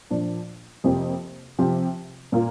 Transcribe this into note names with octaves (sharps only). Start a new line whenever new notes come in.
A#2 F3 D4
F2 C3 F3 A#3 G4
C3 F3 C4 G4
A#2 A#3 F4